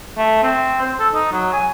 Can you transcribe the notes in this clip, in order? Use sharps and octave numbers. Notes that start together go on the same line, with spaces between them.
A3
C4
C5
A4
D#4
F#3
G#5